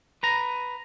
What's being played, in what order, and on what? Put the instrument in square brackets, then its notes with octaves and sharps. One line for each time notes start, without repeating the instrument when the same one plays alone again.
[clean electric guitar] B4 A#5